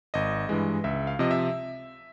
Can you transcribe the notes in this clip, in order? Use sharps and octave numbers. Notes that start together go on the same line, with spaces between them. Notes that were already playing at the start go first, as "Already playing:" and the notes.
G#1 D#5
G2 E3 G#3
C#2 E5
F5
C3 F3 D#5
E5